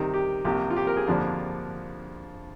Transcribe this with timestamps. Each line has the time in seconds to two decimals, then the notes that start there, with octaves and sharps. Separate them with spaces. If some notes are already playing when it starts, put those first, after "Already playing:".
Already playing: C3 D#3 G3
0.14 G4
0.44 C2 C3 F3 A#3 G4
0.70 F4
0.77 G4
0.87 A#4
0.97 G#4
1.07 F2 D3 F3 A#3 D4